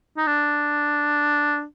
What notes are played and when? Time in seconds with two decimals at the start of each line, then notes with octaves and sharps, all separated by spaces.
0.17 D#4
0.27 D4